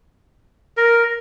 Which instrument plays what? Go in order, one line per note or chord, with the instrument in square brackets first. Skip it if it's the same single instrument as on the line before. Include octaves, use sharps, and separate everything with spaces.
[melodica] A#4